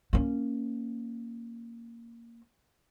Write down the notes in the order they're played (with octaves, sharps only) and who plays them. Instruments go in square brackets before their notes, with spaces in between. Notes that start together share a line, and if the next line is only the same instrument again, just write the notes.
[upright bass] A#3 C#4